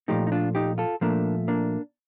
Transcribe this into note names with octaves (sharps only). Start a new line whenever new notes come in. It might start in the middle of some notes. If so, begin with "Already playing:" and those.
A#2 F3 A3 D#4 G4
D#4
D4 F4
D#4 G4
F4 A4
A#2 F3 A3 A#3 D4
A#3 D4